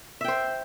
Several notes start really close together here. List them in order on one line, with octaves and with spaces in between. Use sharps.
E5 G5 C5